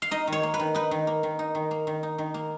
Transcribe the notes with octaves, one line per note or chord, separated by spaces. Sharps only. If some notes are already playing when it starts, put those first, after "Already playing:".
F5
D#4 D#5
D#3 C#5
A#3
B4
D#3
D#4 B4
D#3
A#3
D#3
D#4
D#3
A#3
D#3
D#4
D#3
A#3